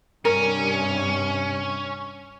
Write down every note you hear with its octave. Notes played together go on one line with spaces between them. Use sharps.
G2 C3 C#4 A#4